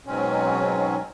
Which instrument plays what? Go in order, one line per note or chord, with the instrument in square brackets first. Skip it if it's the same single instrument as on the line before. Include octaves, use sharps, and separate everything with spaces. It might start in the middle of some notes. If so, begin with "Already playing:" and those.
[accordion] G#2 B2 F#3 C4 C#4